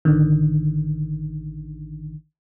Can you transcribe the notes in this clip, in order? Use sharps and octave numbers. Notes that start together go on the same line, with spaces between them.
A1 D3 D#3